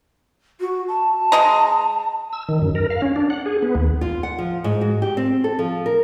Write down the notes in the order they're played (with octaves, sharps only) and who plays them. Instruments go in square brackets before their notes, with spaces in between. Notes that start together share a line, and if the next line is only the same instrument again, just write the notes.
[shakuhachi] F#4
A5
[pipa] G#3 D#5 A#5
[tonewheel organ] E6
D#3
F#2
A#4
F5
C#4
D4
F#5
G#4
B3
D#2
[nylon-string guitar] F4
F#5
F3
G#2
F#4
G4
C4
A4
F3
A#4